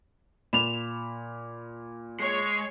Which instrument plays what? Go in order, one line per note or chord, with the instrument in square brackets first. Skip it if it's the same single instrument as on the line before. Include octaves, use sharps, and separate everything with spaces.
[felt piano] A#2 B5 [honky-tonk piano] E7 F7
[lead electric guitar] G#3 [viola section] C#5